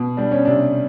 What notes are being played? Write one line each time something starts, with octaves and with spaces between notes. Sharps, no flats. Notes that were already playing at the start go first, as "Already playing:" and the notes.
Already playing: B2
G3 D4
C#4
C3 D4